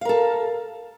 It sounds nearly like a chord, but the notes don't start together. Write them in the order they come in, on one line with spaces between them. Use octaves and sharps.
F5 A#4 A4